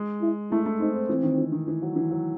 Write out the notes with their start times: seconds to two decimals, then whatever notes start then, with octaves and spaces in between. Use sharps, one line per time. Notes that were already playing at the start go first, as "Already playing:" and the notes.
Already playing: G#3
0.22 E4
0.51 A3 E4
0.66 A3
0.80 C4 D#4
0.94 C4
1.09 E3 C4
1.23 D#3
1.38 E3
1.52 D#3
1.67 E3
1.82 F#3
1.96 E3
2.11 F#3